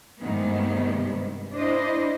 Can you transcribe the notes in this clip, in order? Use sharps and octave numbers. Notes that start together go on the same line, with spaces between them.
G2 C3 D#3 G#3 A3 B3
D4 E4 C5 D#5